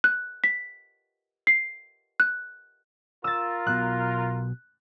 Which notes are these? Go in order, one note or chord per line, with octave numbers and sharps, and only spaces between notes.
F#6
B6
C7
F#6
F4 A#4 E6 A6
B1 B2 F#6